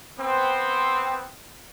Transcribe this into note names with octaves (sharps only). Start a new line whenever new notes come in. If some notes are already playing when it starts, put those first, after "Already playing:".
B3 C4